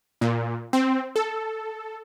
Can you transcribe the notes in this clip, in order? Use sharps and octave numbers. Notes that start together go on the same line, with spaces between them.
A#2
C4
A4